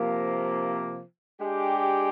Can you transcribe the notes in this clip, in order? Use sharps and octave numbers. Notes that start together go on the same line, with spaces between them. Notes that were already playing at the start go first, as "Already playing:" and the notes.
Already playing: C3 F3 A#3
G#3 D4 G4